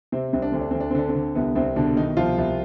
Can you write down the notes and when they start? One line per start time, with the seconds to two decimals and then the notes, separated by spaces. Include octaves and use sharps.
0.12 C3 C4
0.33 C2 C4
0.42 D4
0.52 D2 C4
0.61 D4
0.71 D2 C4
0.80 D4
0.90 C4
0.95 D3 D4
1.09 C4
1.15 D3
1.35 C2 B3
1.55 C2 C4
1.76 B2 D3 D4
1.96 B2 D#3 D#4
2.17 C2 F3 F4
2.38 C2